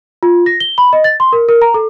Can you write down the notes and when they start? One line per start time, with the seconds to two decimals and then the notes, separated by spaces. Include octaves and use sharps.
0.23 F4
0.46 A#6
0.60 G7
0.78 B5
0.93 D#5
1.04 A6
1.20 C6
1.33 A#4
1.49 A#4
1.62 A#5
1.74 A4